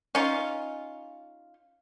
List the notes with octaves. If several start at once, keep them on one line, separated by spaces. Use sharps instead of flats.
C#4 D#4 F4